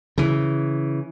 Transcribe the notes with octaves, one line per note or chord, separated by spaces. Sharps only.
C#3 E3